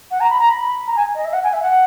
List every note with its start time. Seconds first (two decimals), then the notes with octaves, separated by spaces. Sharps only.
0.10 F#5
0.20 A#5
0.30 B5
0.39 A#5
0.49 B5
0.87 A#5
0.96 G#5
1.14 D#5
1.24 E5
1.33 F#5
1.43 G#5
1.52 E5
1.62 F#5